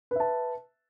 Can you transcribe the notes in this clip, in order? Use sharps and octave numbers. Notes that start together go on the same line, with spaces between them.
B4 E5 A5